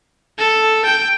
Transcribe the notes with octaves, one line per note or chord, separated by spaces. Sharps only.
A4
G5